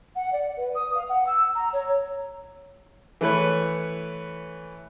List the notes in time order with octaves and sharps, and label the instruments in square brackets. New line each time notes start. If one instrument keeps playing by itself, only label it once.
[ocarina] F#5
D5
B4
D#6
F5
F#5
E6
A#5
C#5
[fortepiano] E3 A3 B4 C#5